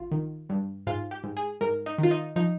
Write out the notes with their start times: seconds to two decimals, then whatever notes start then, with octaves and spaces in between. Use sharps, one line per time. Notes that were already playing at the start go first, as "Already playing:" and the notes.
Already playing: G#1 F4
0.11 D#3
0.49 G2
0.87 G#2 F4
1.11 G4
1.24 G#2
1.37 G#4
1.61 G#2 A#4
1.86 D#4
1.98 D#3 F4
2.11 D#4
2.36 F3 D#4